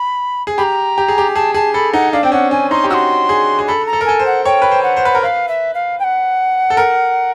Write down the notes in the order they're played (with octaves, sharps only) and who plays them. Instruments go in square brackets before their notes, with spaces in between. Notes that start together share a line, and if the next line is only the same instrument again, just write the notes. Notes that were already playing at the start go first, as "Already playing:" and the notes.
Already playing: [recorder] B5
[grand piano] G#4
[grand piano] G4 [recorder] B5
[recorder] A#5
[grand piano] G4
G#4
G4
[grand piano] G#4 [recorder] A5
[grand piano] G#4 [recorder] A5
[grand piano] A4 [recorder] B5
[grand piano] D#4 [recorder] F#5
[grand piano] D4 [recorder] F5
[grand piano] C4 [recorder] G5
[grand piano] C#4 [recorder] F#5
[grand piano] C#4 [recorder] G#5
[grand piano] D#4 [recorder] C6
[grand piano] G4
[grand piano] F#4 [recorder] C6 E6
[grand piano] G#4
G#4
[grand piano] A4 [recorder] B5
[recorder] A#5
[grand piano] A4
A#4
[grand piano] A4 [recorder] G#5
[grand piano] C5
[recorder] F#5
[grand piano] C#5 [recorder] G5
[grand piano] B4
C5
[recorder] F#5
[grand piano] C5
B4
A#4
[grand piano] B4 [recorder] F5
[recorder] E5
F5
G5
F#5
[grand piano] A4
A#4